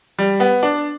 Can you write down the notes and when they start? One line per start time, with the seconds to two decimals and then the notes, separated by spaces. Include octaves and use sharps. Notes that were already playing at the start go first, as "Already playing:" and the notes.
0.19 G3
0.40 B3
0.63 D4